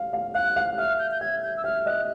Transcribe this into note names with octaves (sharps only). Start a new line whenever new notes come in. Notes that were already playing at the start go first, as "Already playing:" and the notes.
Already playing: F5
F5
F5 F#6
F5
E5 F6
G6
G6
E5 G#6
G6
E6
E5 F6
D#5 F#6